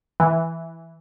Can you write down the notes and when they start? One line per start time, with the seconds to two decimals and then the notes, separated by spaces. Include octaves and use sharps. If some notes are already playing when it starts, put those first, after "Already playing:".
0.20 E3